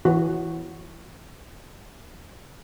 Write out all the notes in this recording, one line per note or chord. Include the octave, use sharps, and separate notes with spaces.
E3 F#4